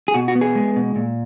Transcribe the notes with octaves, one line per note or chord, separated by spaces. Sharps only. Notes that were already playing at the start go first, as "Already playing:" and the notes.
G#4
B2 F#4
F#4
B3
G#4
G#3
B2
A#2